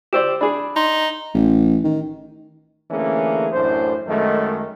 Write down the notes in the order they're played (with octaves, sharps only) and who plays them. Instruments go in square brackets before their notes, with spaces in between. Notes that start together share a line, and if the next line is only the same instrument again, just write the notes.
[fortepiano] G4 C5 D5 [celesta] E6 D7 E7
[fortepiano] D4 G#4 [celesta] B5
[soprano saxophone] D#4 [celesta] C6
[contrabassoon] A1
D#3
[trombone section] D3 E3 A3 A#3 C#4 G#4
A1 F#2 A2 D4 C5
F#2 D#3 G#3 A3